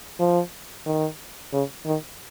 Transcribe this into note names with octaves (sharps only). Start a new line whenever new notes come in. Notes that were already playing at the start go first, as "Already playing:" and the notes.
F3
D#3
C#3
D#3